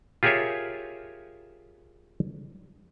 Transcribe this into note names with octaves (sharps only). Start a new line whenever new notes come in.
F4 G4 G#4 A#4 C#5 E5